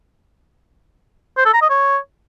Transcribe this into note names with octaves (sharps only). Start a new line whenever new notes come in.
C5
A4
A#5
D#5
C#5